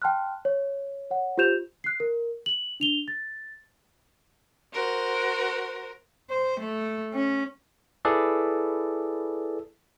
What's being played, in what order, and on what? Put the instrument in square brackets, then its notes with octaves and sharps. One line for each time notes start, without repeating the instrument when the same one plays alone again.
[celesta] G5 A5 C6 F6 F#6
C#5
C#5 F#5
F4 G4 C5 G6 E7 F7
F#6 C7
A#4
F#7
D4 F7 G7
A6
[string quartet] F#4 A#4 C5
[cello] C5
A3
C#4
[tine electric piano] E4 G#4 A4 B4 D5